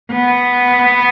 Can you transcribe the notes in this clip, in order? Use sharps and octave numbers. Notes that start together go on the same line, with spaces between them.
B3